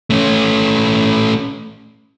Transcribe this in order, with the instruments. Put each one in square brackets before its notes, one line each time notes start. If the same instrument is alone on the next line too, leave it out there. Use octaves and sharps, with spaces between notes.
[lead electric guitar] A3 C#4